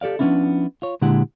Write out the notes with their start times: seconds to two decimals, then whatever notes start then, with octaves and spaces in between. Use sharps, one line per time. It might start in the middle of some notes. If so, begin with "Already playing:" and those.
0.01 G4 A4 D5 F5
0.19 F3 A#3 B3 C#4 D4 E4
0.82 F4 C#5
1.02 A#2 D3 G#3 E4 G4 F#5